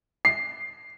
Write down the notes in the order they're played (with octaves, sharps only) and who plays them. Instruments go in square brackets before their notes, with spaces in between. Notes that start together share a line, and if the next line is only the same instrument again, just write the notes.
[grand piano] C7